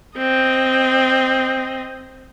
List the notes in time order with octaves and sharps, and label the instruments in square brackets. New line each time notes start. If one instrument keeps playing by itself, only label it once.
[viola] C4 D#5